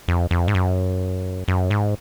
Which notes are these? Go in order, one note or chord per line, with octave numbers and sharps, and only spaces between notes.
F2
F2
G#2
F#2
F#2
G#2